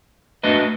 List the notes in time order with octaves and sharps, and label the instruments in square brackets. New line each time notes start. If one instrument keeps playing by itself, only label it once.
[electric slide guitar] A3 D4 F#4 B4 D#5